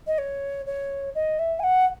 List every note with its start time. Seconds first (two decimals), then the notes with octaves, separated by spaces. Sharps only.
0.07 D#5
0.18 C#5
0.66 C#5
1.15 D#5
1.39 E5
1.59 G#5
1.63 F#5